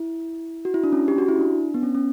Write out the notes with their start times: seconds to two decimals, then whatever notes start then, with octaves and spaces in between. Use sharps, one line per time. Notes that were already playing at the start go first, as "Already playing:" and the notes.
Already playing: E4
0.65 F#4
0.74 E4
0.84 D4
0.92 C#4
1.08 G4
1.18 F#4
1.29 E4
1.39 D4
1.74 B3
1.83 C#4
1.95 C#4